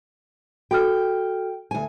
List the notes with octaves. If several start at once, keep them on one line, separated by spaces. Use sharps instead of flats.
F#4 A4 G5 F6
D2 G#5